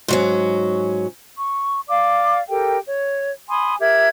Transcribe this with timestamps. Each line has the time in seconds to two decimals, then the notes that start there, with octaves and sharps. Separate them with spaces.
0.08 G#2 F#3 C#4
1.38 C#6
1.88 D5 F5 D6
2.50 G4 A4 A#4 G5
2.86 C#5
3.49 G#5 B5 C6 D#6
3.80 G4 A#4 E5 G#6